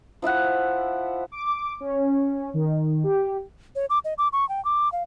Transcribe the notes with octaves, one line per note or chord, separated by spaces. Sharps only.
F3 E4 E5 F#5
D6
C#4
D#3
G4
C#5
D6
D#5
D6
C#6
G5
D6
F5